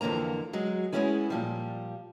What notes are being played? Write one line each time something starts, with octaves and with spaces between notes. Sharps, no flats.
F2 D3 E3 A#3 A#5
F#3 G#3 F#4
G#3 A#3 B3 C#4 E4 G#4
A#2 F3 G3